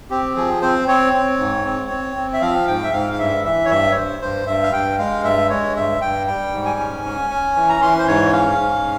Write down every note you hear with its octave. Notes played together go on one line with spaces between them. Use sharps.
C4 G4
F3 G#4
C4 C5
C4 C#5
C4
G#2
C4
C4
C4
E5
F3 F5
G#2 G5
E5
G#2 F5
F5
G2 E5
E3 E5
C#5
G2 E5
C#5
G2 C5
G2 C5
G2 E5
F5
G2 G5
G#3 F5
G2 E5
G#3 C#5
G2 E5
G2 G5
G3 G5
G#2
G#5
C#4
C#4
C#4
E3
A#5
E3 C6
C5
G#2 C#5
C#4 F5
G#2